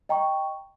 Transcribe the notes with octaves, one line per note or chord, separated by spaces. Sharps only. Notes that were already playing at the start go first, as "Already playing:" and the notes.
D#5 G5 A#5 C#6